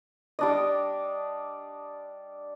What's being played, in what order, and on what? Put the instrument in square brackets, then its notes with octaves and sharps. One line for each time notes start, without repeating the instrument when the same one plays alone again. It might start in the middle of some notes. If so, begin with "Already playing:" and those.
[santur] G3 D4 D#5